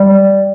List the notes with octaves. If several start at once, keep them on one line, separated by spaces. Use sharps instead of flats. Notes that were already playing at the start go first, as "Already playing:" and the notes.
Already playing: G3